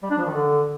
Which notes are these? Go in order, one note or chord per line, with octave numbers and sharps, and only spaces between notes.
G3
D4
F3
D#3
D3